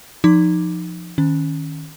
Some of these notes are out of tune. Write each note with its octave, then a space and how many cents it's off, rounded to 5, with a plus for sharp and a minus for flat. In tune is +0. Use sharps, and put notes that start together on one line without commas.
F3 +0 D#4 -5 D6 -5
D#3 +0 C#4 +0